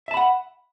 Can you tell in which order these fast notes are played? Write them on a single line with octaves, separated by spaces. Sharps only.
E5 A5 B5 F#5